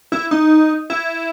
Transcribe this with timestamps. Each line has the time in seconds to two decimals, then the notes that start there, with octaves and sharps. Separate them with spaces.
0.12 E4
0.31 D#4
0.90 E4